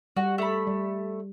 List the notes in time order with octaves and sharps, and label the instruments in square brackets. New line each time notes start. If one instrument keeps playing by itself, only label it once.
[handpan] G3 [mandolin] F#4
[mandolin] A3 B5
[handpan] G3